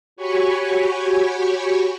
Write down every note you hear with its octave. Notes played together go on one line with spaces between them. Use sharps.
F#4 G4 C#5 G#5 B5 C#6